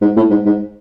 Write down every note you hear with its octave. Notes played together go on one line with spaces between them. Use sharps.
G#2
A2
G#2
G#2